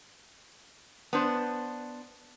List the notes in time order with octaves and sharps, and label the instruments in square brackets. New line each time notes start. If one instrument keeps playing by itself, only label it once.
[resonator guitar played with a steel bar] B3 D4 C5